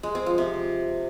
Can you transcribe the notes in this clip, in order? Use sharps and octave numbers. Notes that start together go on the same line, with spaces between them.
G#3
C4
F3
C3